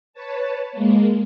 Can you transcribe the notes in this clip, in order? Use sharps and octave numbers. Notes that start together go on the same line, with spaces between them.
B4 C#5 A5
G#3 A#3